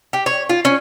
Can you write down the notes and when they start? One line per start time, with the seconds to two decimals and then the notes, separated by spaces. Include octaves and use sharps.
0.13 G4
0.26 C#5
0.50 F4
0.65 C#4